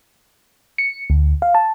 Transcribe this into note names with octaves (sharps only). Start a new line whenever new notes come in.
C#7
D2
F5
A5